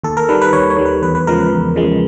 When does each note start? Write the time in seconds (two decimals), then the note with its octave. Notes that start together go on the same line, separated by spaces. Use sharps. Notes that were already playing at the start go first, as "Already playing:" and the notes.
0.04 D#2 A4
0.17 A#4
0.29 D#3 G3 B4
0.42 B4
0.53 D#2 C#5
0.70 C#5
0.77 D#3 G3
0.86 B4
1.02 E2 B4
1.15 B4
1.27 C#3 F3 G#3 A#4
1.40 B4
1.51 E2
1.76 C#3 F3 G#3